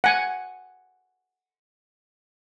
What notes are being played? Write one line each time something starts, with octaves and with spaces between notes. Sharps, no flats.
F#5 G#5